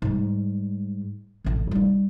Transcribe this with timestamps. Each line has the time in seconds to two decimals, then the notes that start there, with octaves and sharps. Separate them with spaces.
0.02 G#2 G3
1.44 A1 D3
1.71 G3 D#4